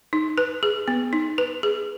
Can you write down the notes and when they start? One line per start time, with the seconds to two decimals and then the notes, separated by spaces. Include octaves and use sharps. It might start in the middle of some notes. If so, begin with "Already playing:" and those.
0.13 D#4
0.38 B4
0.63 G#4
0.88 B3
1.13 D#4
1.38 B4
1.63 G#4